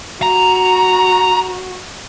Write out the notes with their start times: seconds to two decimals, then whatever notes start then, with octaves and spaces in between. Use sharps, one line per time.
0.22 F#4 A#5